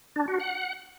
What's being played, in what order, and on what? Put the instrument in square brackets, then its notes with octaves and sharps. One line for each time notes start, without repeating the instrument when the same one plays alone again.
[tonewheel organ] D4
F#4
F#5